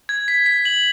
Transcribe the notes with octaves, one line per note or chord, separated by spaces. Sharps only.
G#6
B6
B6
F#7